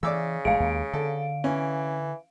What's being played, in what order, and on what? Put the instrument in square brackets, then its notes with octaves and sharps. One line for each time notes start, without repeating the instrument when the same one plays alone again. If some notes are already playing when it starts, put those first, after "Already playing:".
[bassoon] C#3 [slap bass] E3 [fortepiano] D5 D6 E6
[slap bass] A1 G2 [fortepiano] G#3 [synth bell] F5 D7
[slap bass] D#2 A#3
[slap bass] D3 [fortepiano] A4
[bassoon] E3 [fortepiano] C#4